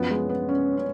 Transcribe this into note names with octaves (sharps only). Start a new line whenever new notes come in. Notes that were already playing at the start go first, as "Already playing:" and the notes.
Already playing: F#2 F3 B3
G#3
B3
C#4
C#4